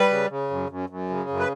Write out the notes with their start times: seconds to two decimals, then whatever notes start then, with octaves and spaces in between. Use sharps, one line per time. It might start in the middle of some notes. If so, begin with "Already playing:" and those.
Already playing: G3 B4
0.10 C#3
0.30 C#3
0.50 F#2
0.70 F#2
0.89 F#2
1.10 C#3
1.29 F#2
1.39 B4